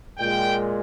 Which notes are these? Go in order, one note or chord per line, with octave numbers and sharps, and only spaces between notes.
A#2 G#3 G5